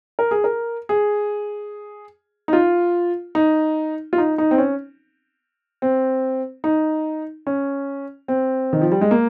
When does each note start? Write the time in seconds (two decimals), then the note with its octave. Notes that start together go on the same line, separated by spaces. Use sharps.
0.19 A#4
0.31 G#4
0.44 A#4
0.89 G#4
2.48 D#4
2.53 F4
3.35 D#4
4.13 F4
4.18 D#4
4.38 D#4
4.51 C4
4.58 C#4
5.82 C4
6.64 D#4
7.47 C#4
8.28 C4
8.73 D#3
8.81 F3
8.92 G3
9.01 G#3
9.11 A#3